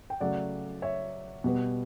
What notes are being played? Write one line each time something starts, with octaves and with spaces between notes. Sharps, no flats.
G5
C#3 F#3 A3 D5 F#5
C#5 E5
B2 G3 B3